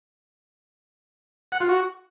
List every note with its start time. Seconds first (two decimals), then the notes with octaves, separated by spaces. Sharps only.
1.52 F#5
1.60 F4
1.69 F#4